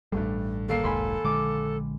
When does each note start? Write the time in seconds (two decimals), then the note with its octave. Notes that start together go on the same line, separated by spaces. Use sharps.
0.12 A1 G2 G3 A3
0.68 D#2 A#3 A4 C7
0.84 F1 C2 G#2 G#5 B5 C6
1.25 A#1 D3 G#3 D6